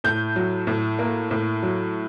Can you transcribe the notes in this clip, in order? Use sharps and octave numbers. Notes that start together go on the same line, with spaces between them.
A2 G6
F#3
A2
A#3
A2
F#3